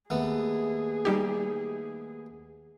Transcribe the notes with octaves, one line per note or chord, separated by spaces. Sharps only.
D#2 A3 B3 G#4
G3 D#4 G4